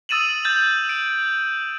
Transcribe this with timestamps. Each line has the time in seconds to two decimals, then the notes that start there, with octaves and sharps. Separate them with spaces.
0.09 D#6 E6 A6 D#7 E7 F#7
0.44 G6 A6 E7
0.89 D7